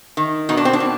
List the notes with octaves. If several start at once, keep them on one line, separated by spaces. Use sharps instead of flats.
D#3
B2 D#4
D4
C4
D4
B2